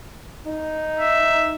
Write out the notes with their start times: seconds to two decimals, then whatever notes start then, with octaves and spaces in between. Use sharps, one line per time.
0.47 D#4
1.00 E5